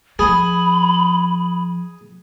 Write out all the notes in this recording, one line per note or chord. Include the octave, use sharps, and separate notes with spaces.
F3 G#4 B5